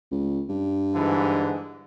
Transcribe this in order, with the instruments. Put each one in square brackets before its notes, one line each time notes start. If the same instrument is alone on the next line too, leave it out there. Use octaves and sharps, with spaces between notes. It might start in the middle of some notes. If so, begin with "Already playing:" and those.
[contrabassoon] C#2
G2
[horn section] G#2 D3 E3